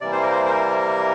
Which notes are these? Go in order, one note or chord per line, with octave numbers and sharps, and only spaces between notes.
C3 E3 G3 A#3 D5
C5
A#4
C5
C5
A#4